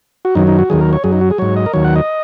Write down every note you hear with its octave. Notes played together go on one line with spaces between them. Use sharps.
F#4
F#2 D#3 F#3 D#4
D#4
F#4
D#2 D#3 F#3 G#4
A#4
C#5
F#2 F#3 G#4
D#4
F#4
G#4
G#2 F#3 C#5
D#5
A#4
D#2 D#3 F#3 C#5
F#5
D#5